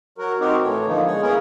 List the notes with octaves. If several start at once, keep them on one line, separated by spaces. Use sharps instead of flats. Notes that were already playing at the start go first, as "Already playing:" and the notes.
F#3 F#4 A#4
C4 D#4 F#4 G4 A#4
A2 E3 A3 C#5
D3 F3 A#3 B3 D#4
G#3 G#4 C#5
A#3 B3 C#4 E4 G#4 A#4